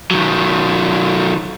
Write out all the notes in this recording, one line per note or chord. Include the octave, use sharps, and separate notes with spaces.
D#3 F#3